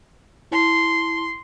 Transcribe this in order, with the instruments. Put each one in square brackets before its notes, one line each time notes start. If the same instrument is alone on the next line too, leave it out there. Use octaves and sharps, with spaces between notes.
[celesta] E4 A5 [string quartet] C6